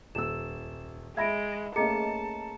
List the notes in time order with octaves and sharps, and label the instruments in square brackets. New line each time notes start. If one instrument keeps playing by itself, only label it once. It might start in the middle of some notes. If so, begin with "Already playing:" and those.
[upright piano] D#1 E6 [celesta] E7
[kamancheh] G#3 [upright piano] E5 B5 [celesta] G#6 A#6 D7
[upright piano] A3 A#3 C#4 [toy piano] G#4 D#5 [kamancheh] A5 [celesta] A#5 C#7